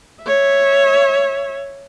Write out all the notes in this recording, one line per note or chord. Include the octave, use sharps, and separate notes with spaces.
C#5 E5